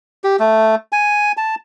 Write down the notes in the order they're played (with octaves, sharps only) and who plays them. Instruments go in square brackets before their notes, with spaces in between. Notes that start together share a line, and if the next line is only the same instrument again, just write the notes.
[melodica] G4
A3
G#5
A5